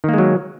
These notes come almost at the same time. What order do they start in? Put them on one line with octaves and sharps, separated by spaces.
D#3 A#3 G#3 F#3